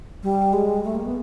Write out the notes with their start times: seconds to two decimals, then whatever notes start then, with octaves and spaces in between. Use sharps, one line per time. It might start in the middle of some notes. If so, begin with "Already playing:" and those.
0.23 G3
0.53 G#3
0.84 A3
0.95 A#3
1.05 B3